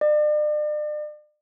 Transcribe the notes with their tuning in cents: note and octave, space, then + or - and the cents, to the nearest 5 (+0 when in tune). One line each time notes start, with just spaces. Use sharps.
D5 +40